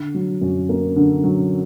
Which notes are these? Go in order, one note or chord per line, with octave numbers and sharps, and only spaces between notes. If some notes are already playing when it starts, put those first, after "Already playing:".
Already playing: D3
F#3
F#2
A#3
D3
F#3